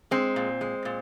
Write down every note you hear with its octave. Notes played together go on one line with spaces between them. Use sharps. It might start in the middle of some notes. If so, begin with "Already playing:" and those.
G#3 C4
A#2
G#3
A#2